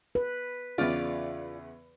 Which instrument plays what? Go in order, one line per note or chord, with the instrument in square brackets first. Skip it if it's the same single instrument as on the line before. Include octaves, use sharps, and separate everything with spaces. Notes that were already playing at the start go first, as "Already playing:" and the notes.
[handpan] B4
[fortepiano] E2 C#3 [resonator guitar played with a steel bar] F4 D5